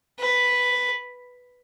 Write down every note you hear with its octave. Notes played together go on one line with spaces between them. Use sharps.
B4